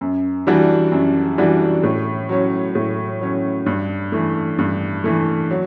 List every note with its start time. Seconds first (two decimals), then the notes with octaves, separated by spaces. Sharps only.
0.01 F#2
0.47 E3 G3 D4 F#4
0.92 F#2
1.38 E3 G3 D4 F#4
1.83 A2
2.29 F#3 C#4
2.75 A2
3.21 F#3 C#4
3.66 G2
4.12 E3 A3
4.59 G2
5.04 E3 A3
5.50 F#3